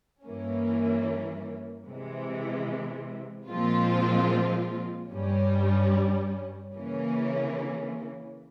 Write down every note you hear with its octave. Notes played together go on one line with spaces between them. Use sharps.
G2 E3 A#3 C#4
C3 E3 G#3
A#2 F3 G#3 C4 F4
G2 G3 C#4
C#3 E3 A#3 C#4